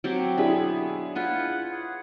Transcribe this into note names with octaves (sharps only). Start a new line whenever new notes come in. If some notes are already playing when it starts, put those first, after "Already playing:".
F#3 C4 G4
B2 D3 B3 D4 E4 G#4 B5
F4 B4 F#5 G#5
G#4 C#5 F#5